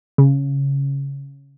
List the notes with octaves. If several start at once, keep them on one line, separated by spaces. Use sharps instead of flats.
C#3